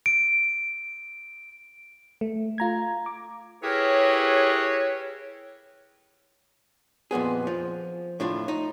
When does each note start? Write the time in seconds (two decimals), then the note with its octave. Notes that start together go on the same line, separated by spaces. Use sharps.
0.06 D7
2.21 A3
2.58 F4 A#5 G#6
3.06 D6
3.63 E4 G4 G#4 A#4 B4 C#5
7.11 F2 A#2 B3 G#4
7.47 F3
8.20 A2 D4 F4
8.48 D#4